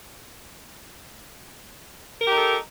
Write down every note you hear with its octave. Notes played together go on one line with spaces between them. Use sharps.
D#4 G4 A4 A#4